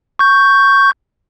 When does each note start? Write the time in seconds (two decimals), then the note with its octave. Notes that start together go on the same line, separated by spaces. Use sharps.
0.19 C#6 G6